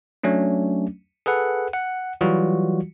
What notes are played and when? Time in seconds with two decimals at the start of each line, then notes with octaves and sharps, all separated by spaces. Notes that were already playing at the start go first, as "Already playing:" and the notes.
0.24 F#3 A3 C#4 D4
1.26 G#4 A4 B4 F#5
1.73 F#5
2.21 E3 F#3 G3 F4 F#4